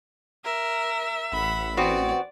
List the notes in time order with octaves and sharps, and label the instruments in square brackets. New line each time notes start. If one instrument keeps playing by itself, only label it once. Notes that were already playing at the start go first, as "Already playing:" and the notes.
[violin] A#4 [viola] E5
[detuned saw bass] A1 [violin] F#5 B5
[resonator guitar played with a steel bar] B3 C4 F#4 [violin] D5